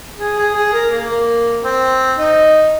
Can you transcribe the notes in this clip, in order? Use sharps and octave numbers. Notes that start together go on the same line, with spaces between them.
G#4
G#4
G#4
A#4
A#3
A#3
C4
D#4